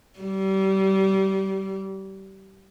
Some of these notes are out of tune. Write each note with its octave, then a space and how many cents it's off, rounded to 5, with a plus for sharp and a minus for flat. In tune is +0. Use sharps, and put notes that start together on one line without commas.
G3 -30